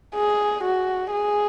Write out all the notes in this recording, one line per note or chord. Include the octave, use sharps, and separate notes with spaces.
G#4
F#4
G#4